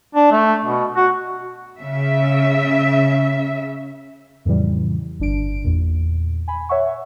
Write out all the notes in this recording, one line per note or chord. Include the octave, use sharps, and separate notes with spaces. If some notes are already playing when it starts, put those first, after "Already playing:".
D4
A3
B2
F#4
C#3 E5
F2 A2 C#3 E3 G3
G1 D4 D7
E2 A#2
G#5 B5
C#5 E5 F#5 C#6